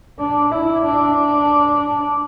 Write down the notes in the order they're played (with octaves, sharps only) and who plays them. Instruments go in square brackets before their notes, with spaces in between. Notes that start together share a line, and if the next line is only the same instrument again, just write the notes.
[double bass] D4
E4
D4